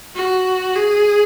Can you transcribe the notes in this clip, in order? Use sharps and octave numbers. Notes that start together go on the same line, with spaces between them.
F#4
G#4